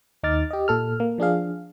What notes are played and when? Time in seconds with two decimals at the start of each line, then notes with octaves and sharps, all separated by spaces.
0.23 D#2 D#4 D6 F6 A6
0.51 G4 D#5
0.68 A#2 A4 F6
1.00 A#3
1.18 F3 D4 G#4 F5